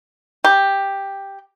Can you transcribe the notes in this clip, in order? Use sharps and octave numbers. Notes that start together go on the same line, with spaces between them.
G4